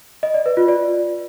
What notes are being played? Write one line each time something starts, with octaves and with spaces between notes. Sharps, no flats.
D#5
D5
B4
F4
D5